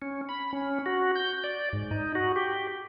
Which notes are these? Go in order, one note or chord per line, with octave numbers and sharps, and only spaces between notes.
C#4
B5
C#4
F#4
G6
D5
G#2
D#4
F#4
G4